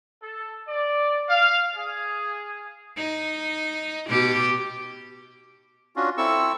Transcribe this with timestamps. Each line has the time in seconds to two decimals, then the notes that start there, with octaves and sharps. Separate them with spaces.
0.22 A4
0.68 D5
1.28 F5
1.75 G#4
2.96 D#4
4.09 B2 G4
5.96 C#4 D4 F4 F#4
6.18 C4 E4 A4 C#6 E6